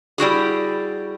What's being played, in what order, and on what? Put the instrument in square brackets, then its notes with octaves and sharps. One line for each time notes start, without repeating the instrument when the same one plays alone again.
[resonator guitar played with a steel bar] G3 E4 F#4 G#4